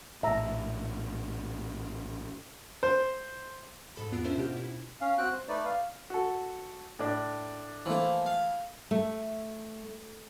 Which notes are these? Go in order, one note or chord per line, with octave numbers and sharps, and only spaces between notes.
A#1 A2 E5 A#5
C5
G#2 A4 B5
E2 B3 F4 E6 D7
C#4 D4 F4 A#4 C5 E5
B2 G4 F6 G6
E4
C#4 F5
C4 F#4 G5 F#6
C5
A3 D#4 B4 D5
F5
F#4 A4
A2 D4
E3 F3 A3 A#3
F5
A3